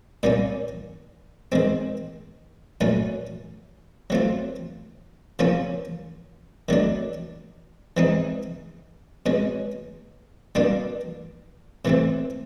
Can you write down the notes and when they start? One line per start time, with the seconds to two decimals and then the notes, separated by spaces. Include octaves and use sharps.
0.23 A#2 G3 A#3 C#4
1.52 D#3 G#3 C4
2.81 A#2 F#3 A3 C#4
4.10 F#3 A3 C4 F4
5.39 C#3 F3 A#3 C#4 F4
6.69 D#3 F#3 A3 D4
7.97 E3 G#3 C4 D#4
9.26 B2 G#3 C#4
10.55 B2 G3 A#3 D4
11.85 C3 E3 A3 C4